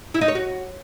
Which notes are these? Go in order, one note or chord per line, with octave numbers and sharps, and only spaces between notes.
E4
D#4
C#5
F#4